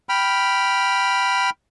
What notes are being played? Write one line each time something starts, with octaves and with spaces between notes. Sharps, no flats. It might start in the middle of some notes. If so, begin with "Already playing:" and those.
G5 B5 F6